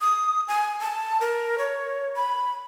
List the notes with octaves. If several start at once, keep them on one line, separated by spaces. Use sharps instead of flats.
D#6
G#5
A5
A#4
C#5
B5